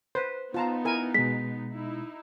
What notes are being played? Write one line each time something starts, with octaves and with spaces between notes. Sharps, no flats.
B4 C5
B3 D#4 F4 A5 A#5
E4 A#4 G#5
B2 G#3 B6
D#4 E4